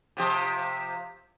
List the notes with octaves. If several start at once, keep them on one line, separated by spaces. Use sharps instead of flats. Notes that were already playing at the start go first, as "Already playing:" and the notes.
C3 F3 G4